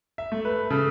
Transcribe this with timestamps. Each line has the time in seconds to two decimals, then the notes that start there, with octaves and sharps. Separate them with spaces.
0.18 E5
0.32 A3
0.45 B4
0.70 C#3 A4